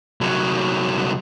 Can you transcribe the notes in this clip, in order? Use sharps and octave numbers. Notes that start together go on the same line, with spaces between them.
C2 F#3